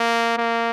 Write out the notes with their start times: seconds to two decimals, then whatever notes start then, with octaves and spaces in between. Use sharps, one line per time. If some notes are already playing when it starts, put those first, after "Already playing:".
Already playing: A#3
0.37 A#3